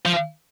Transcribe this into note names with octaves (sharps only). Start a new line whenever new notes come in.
F3